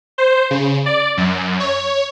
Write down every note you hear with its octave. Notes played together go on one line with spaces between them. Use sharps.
C5
C#3
D5
F#2
C#5